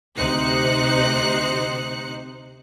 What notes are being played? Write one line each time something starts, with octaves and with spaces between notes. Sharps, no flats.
D2 C3 D#4 C5 F#6 C#7